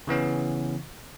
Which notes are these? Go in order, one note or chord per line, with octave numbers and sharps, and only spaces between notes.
C#3 E3 B3 C#4